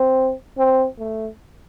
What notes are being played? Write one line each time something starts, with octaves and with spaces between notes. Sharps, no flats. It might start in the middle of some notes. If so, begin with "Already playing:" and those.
Already playing: C4
C4
A3